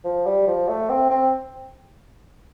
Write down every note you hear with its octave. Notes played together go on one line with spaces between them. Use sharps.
F3
G3
F3
A3
C4
C4